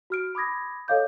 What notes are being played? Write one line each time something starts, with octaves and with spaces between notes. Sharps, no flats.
F#4 F6 D7
B5 D6 D#6 G#6 A#6
A4 C#5 D#5 F5 D6 G6